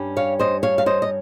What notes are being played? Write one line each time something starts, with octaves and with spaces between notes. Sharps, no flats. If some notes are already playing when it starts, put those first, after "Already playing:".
Already playing: G2 G3 C#4
C#5 F5
C5 D#5
C#5 F5
F5
C5 D#5
D#5